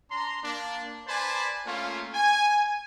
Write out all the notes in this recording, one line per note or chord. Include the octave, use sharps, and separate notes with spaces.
D4 A#5 C6
A#3 D4
B4 C5 D5 G#5 A5 B5
A3 A#3 C#4 F4
G#5